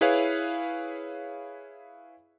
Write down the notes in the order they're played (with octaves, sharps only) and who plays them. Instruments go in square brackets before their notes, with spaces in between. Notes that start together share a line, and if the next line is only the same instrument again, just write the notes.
[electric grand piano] E4 G#4 B4 C#5 F5